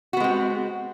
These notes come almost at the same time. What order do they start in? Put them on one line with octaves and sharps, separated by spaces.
F#4 B3 G#3 C4